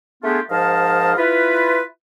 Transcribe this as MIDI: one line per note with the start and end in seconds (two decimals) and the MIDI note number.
0.23 0.40 57
0.23 0.40 59
0.23 0.40 62
0.23 0.40 65
0.23 0.40 67
0.23 0.40 68
0.50 1.14 44
0.50 1.14 53
0.50 1.14 70
0.50 1.14 75
0.50 1.14 77
0.50 1.14 81
1.17 1.82 64
1.17 1.82 65
1.17 1.82 71